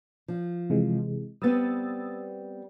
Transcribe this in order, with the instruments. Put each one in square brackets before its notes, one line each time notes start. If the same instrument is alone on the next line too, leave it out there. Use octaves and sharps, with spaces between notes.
[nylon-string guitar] F3
[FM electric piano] C3 E3 G#3
[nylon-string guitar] G3 B3 C4 [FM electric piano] D#6 E6 A6